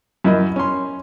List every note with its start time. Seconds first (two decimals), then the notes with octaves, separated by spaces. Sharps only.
0.24 F#2 E4 A#4 D#5
0.56 C#4 C6